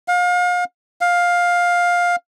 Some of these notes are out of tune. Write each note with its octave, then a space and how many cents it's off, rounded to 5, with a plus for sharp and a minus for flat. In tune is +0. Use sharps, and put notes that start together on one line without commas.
F5 +35
F5 +15